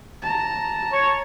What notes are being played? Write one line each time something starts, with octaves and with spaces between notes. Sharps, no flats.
A5 A#5
C#5